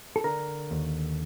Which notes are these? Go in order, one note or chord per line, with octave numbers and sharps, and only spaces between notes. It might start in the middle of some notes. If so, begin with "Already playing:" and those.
A4
D3 A#4
D#2